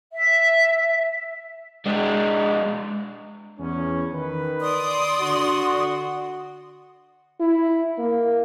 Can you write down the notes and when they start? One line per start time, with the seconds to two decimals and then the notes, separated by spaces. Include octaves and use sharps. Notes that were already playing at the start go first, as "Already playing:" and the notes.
0.13 E5
1.86 G#3 D4
3.58 E2 C#4
4.12 D#3 B4
4.62 D5 C6 D#6
5.20 D3 F#4
7.40 E4
7.98 A#3